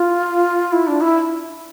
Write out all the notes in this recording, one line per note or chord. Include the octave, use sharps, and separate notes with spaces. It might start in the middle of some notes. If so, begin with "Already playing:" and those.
Already playing: F4
E4
D4
E4